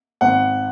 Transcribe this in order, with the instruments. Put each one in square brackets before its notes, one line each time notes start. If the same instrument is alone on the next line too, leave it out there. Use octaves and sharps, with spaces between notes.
[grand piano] G#1 F#5